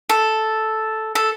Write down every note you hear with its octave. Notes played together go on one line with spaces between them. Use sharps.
A4
A4